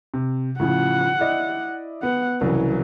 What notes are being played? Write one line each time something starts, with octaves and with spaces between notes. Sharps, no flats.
C3
A2 C#3 F3 F#5
E4 D5 D#5
B3 F#5
C2 C#3 E3 F#3